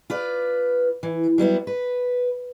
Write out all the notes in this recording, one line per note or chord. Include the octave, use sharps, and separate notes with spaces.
F4 B4 D5
E3
F#3 G3 B3 E4
B4